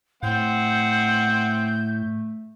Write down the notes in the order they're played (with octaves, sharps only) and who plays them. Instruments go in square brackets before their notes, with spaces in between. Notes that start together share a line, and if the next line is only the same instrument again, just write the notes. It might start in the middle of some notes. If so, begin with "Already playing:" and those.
[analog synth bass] A2 [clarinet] A3 [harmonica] C4 F#5 [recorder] G6